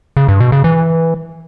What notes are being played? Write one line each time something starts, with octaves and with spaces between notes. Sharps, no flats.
C#3
G2
B2
C#3
E3